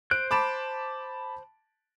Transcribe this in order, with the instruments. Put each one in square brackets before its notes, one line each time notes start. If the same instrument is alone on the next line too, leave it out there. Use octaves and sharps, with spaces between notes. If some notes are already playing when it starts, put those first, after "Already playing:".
[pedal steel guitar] C5 F#6 [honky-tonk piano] D7
[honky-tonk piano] A5 B5 D6